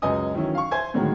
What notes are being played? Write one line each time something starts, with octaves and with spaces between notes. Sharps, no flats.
C#2 F#2 B4 D#5 G#5 D#6
D#3 E3 F#3 C#4 E4
F5 C#6
C5 E5 G#5 G#6
A2 D3 D#3 F#3 G#3 A#3